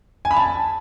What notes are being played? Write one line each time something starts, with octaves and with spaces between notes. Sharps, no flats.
G#5
B5
A5